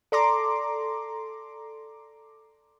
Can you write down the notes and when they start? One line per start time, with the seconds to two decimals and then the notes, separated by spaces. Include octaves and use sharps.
0.12 A4 D5 A#5 C6 D6